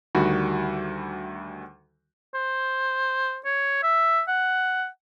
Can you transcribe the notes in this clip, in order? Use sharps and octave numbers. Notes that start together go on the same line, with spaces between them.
D2 D#3 G3 F#4 B5
C5
C#5
E5
F#5